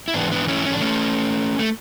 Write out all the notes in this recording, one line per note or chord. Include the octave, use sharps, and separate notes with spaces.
E4
G#2 E3 B3 D4
B3 D4
C#4 E4
C#4
D4
A3 C#4
A3